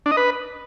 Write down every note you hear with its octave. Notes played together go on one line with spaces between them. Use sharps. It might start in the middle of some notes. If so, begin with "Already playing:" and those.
D4
D#5
B4